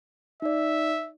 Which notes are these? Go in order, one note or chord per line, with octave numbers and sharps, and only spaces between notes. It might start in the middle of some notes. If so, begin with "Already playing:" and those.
D#4 D5 E5